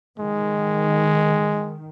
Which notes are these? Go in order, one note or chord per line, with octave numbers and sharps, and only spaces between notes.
D#3 G#3